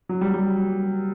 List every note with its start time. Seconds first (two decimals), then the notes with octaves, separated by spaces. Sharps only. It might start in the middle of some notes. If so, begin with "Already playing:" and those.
0.09 F#3
0.21 G3
0.34 G3